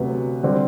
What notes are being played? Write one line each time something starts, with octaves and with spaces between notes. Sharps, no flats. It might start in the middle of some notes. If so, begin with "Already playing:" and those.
Already playing: D2 C3 F#3 B3
D3 G3 C4